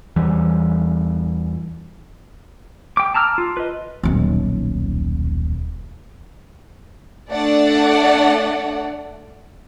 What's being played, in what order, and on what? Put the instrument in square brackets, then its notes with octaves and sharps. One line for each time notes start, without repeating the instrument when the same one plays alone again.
[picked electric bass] E2 E3 G3
[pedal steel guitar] G5 D6
A5 A#5 E6 F6
F4
B4 D#5
[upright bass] D#1 B1
[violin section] A3 D4 D5 F#5